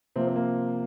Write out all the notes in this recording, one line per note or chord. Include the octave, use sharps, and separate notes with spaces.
C3 F3 A#3 C4
C4
A#3